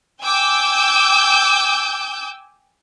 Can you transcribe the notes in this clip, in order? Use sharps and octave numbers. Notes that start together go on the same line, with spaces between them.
G5 G#5 D6 E6 G6